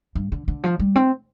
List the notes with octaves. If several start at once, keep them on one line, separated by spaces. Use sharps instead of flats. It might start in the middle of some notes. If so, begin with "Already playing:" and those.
G2
D3
D3
F3
G3
C4